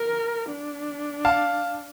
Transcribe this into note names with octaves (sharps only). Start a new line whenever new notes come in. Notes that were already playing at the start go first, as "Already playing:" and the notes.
Already playing: A#4
D4
F5 A5